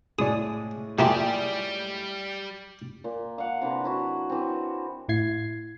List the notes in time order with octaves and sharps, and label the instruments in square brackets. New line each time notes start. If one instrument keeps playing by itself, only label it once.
[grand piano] A2 G#3 [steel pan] G#4 D5 [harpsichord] D#6
[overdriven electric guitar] G3 D5 [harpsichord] A3 A#3 F4 [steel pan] G4 G#4
[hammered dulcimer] A#2
F5 F#5
C3 E3 D4 E4
F#3 E4 F#4
E3 C4
[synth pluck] A2 E4 G#6 C7